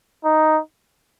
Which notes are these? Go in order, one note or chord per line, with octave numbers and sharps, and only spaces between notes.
D#4